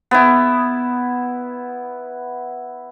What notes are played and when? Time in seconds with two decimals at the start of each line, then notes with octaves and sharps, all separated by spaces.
0.11 B3 E4